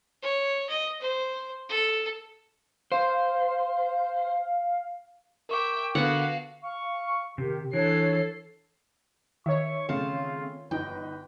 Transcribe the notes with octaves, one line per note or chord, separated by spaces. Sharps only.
C#5
D#5
C5
A4
C5 F5
A#4 E5 G5 C#6 D6
D3 B3 F#4 F5 F#5
F5 C#6
C3 D#3 G4
E3 D4 A4 C#5 C7
D#3 C#5 E5 C#6
C#3 A3 C4 F4 F5 A5
G1 D#4 B4 G5